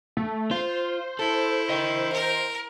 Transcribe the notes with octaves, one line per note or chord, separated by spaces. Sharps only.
A3
F4 C5
E4 A4
D#5 G5
A#4